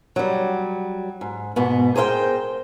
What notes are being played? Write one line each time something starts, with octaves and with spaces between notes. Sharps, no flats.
F#3 G3
G#2
G#2 B2 B3
G#4 A#4 C5 F5 G5